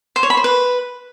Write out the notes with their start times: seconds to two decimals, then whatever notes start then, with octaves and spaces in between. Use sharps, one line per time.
0.16 C5
0.23 C#5
0.30 B5
0.37 C5
0.44 B4